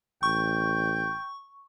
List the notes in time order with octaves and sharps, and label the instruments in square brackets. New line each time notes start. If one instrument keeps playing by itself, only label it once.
[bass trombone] A1 [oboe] G5 [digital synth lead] C#6